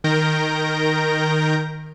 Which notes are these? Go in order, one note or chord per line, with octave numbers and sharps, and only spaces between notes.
D#3 A#4 G6 A#6 D7